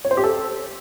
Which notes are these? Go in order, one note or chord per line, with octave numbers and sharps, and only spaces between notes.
C#5
C5
G4
A4